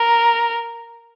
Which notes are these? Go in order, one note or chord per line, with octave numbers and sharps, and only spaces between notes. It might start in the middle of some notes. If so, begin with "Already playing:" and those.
Already playing: A#4